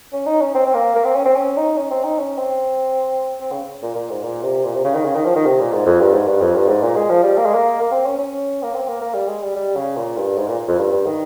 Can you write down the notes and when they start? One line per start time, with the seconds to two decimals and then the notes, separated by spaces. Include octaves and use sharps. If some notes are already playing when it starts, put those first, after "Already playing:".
0.13 C#4
0.26 D#4
0.41 C#4
0.55 C4
0.66 C4
0.74 A#3
0.96 A#3
1.05 C4
1.16 C#4
1.25 C4
1.36 C#4
1.57 D#4
1.77 C#4
1.91 C4
2.04 D#4
2.19 C#4
2.38 C4
3.41 C4
3.52 C#3
3.83 A#2
3.95 A#2
4.10 G#2
4.23 A#2
4.43 C3
4.64 A#2
4.75 C3
4.85 C#3
4.95 D#3
5.05 C#3
5.16 D#3
5.26 F3
5.36 D#3
5.46 C3
5.60 A#2
5.73 G#2
5.86 F2
6.00 G2
6.14 G#2
6.28 G2
6.41 F2
6.55 G2
6.69 G#2
6.82 A#2
6.96 G#3
7.10 F3
7.23 G3
7.37 A#3
7.46 G#3
7.54 A#3
7.81 A#3
7.92 C4
8.06 C#4
8.19 C#4
8.63 A#3
8.74 C4
8.88 A#3
9.02 A#3
9.14 G3
9.28 G#3
9.42 G3
9.56 G3
9.76 C#3
9.96 A#2
10.18 G2
10.38 G#2
10.48 A#2
10.68 F2
10.79 G2
10.92 G2
11.06 D#3